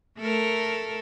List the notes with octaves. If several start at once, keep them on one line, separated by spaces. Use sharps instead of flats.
A3 A4 A#4